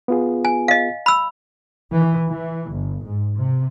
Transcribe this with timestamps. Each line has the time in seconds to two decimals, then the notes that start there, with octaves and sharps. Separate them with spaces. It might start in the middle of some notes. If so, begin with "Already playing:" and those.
0.08 B3 F4 G#4
0.45 G#5
0.68 D#5 F5
1.06 B5 E6
1.92 E3
2.28 E3
2.70 G1
3.05 G#2
3.34 C3